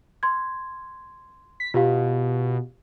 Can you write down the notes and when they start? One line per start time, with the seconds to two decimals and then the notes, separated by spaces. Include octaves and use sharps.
0.23 C6 G#6
1.60 B6
1.74 B2 F4 G4 F5